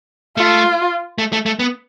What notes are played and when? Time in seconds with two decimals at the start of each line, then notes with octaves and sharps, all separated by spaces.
0.37 A3 F4
1.18 A3
1.33 A3
1.46 A3
1.59 B3